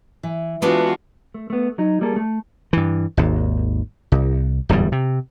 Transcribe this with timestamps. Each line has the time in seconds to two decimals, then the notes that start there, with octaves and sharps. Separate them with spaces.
0.23 E3
0.62 E3 G#3 B3 D4 F4 F#4 B4
1.34 A3
1.50 A3 B3
1.78 F#3 D#4
2.01 G3 A#3 G#4 A4
2.16 A3
2.73 G2 E3
3.17 G#1 D#2
4.12 C2
4.69 D1 E2 G#2 G3
4.92 C3